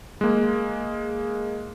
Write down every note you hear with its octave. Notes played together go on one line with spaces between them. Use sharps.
G#3 A#3